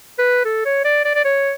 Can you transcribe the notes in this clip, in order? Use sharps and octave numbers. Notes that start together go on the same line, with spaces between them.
B4
A4
C#5
D5
D5
D5
C#5